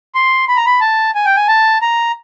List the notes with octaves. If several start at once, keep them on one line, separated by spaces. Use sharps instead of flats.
C6
B5
A#5
B5
A5
G#5
G5
G#5
A5
A#5